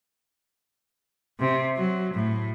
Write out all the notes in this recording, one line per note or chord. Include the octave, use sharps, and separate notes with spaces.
C3
F#3
A2